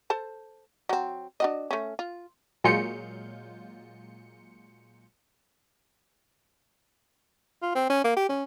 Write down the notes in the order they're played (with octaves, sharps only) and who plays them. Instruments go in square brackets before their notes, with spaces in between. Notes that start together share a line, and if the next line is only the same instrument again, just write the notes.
[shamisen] A4 C5 A5
F#3 C4
D4 F#4 D#5
A3 C#4
F4
[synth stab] A#2 F#3 G#3 F4 G6 C#7
[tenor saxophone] F4
C4
C#4
A#3
G4
C#4